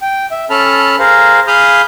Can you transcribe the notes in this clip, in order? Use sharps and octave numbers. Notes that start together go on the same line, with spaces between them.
G5
E5
C#4 A4 A5 B5 F6
G#4 A#4 C5 F5
G#4 F5 B5 D#6 F6 G6